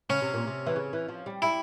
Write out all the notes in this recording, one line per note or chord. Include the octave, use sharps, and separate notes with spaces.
C#3 C#4
C3
A#2
C3
E3
C#3
E3
F3
G3
G3 E4